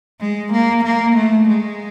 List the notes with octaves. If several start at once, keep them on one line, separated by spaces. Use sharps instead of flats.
G#3
A#3
A#3
A3
G#3